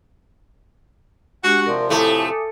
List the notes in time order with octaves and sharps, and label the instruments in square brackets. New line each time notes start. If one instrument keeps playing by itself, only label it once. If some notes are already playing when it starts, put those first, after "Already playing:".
[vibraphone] G#3 D4 G4 [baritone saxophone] F#4 [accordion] F#5 C#6
[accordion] C3 F3 [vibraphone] A#4 D5 C6
[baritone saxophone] A2 [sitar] A3 [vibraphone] G#5 D6 D#6